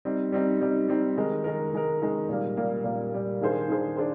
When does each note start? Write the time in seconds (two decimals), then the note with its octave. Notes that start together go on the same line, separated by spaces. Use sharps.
0.05 G3 C4 D#4
0.32 G3 C4 D#4
0.61 G3 C4 D#4
0.89 G3 C4 D#4
1.17 D#3 G#3 D#4 A#4
1.44 D#3 G#3 D#4 A#4
1.73 D#3 G#3 D#4 A#4
2.01 D#3 G#3 D#4 A#4
2.29 A#2 G3 A#3
2.57 A#2 G3 A#3
2.84 A#2 G3 A#3
3.12 A#2 G3 A#3
3.41 D#3 A#3 D4 G#4 C5
3.68 D#3 A#3 D4 G#4 C5
3.96 D4 G#4 C5